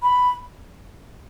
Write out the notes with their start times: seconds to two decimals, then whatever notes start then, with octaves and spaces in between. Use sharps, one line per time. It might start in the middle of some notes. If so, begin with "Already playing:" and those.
0.03 B5